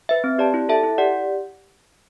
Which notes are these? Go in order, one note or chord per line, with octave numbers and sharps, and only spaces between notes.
B4 E5
C4
G4 D5 A5
E4
A4 E5 A5
E4
G4 D5 F#5